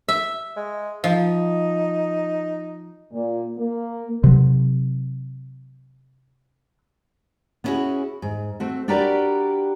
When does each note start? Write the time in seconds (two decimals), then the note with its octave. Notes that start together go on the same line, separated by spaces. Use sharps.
0.09 E5
0.56 G#3
1.04 F3 D#4
3.12 A#2
3.58 A#3
4.24 C3 F#3
7.64 B3 C#4 D4 E4 F#4 G#4
8.22 G#2
8.60 A3 C4 F#4
8.88 D4 F#4 G4 A#4 B4 D5